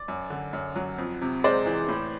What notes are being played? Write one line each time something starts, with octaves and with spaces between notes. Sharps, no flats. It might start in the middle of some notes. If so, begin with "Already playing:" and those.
Already playing: D5
F#2
D3
F#2
F#3
F2
C3
G#3 C5 D5
E3
A2